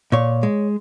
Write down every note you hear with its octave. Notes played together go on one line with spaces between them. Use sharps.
A#2 C#5
G#3